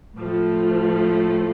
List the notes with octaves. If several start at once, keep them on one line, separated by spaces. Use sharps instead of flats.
A2 F3 A3